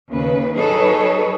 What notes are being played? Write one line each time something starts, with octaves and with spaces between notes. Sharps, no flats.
D#2 C#3 B4
F#3 D#4 G#4 A4 B4 C#5